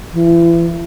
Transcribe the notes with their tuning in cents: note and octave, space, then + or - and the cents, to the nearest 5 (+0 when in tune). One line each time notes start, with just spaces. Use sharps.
E3 +35